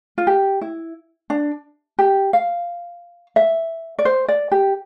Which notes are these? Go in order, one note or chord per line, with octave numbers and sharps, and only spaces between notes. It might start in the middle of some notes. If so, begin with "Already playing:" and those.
F4
G4
E4
D4
G4
F5
E5
D5
C5
D5
G4